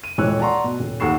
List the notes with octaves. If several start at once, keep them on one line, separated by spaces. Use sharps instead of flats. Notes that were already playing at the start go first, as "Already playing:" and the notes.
D#7
D#1 E3 G#3 C#5 E6 F#6
D5 F#5 A5 A#5 C6 C#6
B2
D#1
D#2 A4 F#5 C#6 C7 E7